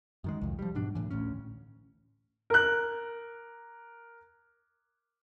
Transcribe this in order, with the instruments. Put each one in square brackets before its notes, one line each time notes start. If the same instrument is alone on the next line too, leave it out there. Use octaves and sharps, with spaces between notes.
[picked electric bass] F#2 D#3 G#3
C2 F2
F3 G3
G#2 B2 D4
A2 E3
A1 D2 A2 C#4
[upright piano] A#4 F#6